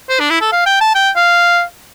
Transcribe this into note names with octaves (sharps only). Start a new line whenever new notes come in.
C5
D4
E4
A4
F5
G5
A5
G5
F5